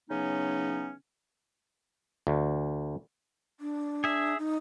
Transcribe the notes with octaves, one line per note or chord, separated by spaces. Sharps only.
C#3 E3 F#3 B3 C#4 D#4
D2
D4
G#4 E5
D#4